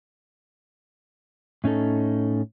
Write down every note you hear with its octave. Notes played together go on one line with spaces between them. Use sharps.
A2 C#4 D#4 A4